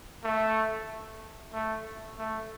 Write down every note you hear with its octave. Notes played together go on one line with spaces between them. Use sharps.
A3
A3
A3